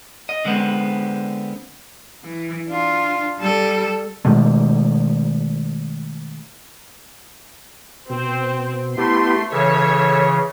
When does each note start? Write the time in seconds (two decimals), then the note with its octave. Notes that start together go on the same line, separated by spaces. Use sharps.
0.29 D#5
0.45 D3 G#3 B3 C4
2.24 E3
2.69 D4 F4
3.39 G3 A4
4.25 B2 D#3 G#3 A3
8.10 B2 C4
8.97 A3 B3 E4 G4 C6
9.52 C#3 E3 A4 C#5 E5